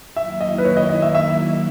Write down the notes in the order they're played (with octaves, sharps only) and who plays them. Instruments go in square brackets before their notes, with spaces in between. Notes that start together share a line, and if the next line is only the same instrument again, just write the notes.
[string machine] D#3 F#3 A#3 E4 [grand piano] E5
[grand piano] D#5
B4
C#5
D#5
D#5
E5
E5